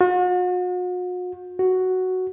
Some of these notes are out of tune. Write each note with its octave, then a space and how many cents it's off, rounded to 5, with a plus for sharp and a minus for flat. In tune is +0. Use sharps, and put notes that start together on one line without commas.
F#4 -40
F#4 +5